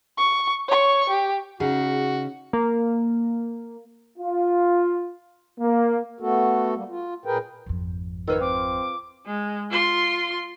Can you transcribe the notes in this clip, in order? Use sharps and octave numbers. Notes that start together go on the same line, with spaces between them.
C#6
C#5 C#6
G4
C#3 D#4 F#4 G#4
A#3
F4
A#3
A3 B3 F#4 A4
G3 A#3
F4
A#2 G#4 A#4 B4 G5
G#1 F2
D#3 F4 B4 C#5 E6
C4 D6
G#3
F4 C6